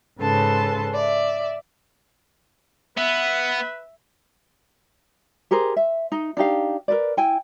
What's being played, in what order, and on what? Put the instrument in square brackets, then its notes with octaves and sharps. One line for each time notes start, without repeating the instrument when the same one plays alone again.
[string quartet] G#2 C#3 A4 B4 A5 C6
D5 E5
[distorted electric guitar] B3 [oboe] B4 [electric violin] E5
[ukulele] G4 G#4 A#4 C5
E5
D#4
D4 D#4 G4 F5
A#4 B4 D5
E4 G5 G#5